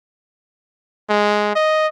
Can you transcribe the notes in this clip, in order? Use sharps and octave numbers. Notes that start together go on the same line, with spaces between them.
G#3
D#5